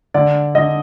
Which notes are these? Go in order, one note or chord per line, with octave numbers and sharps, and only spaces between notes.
D3 D5
D3 D#5